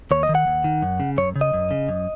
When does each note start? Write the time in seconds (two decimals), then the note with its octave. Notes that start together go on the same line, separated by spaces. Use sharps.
0.11 D#2 C#5
0.23 D#5
0.29 D#3
0.35 F#5
0.47 D#2
0.64 D#3
0.82 F#2
1.00 C#3
1.17 F#2 C#5
1.36 C#3
1.41 D#5
1.53 F#2
1.71 C#3
1.89 F#2